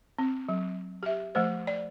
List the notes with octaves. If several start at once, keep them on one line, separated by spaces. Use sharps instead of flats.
C4
F#3
G4 E5
F3 A3 C5
D5